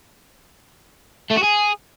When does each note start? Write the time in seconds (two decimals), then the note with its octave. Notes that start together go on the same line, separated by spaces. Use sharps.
1.31 A3
1.37 F#4
1.44 G#4